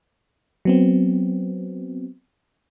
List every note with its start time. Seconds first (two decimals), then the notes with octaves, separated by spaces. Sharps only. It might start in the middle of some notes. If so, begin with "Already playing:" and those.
0.65 F#3 B3 C4